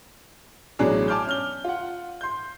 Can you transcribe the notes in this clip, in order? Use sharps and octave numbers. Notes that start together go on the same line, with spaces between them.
A1 B2 F#3 D4 G#4
G#5 A5 D6 F6 G6
C#4 F6 G7
F4 F#5
C6 G6